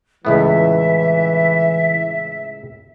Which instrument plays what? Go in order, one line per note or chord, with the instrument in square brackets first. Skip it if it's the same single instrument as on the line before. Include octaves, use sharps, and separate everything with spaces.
[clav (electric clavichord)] C#2 A2 B3 [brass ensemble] E3 [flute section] E5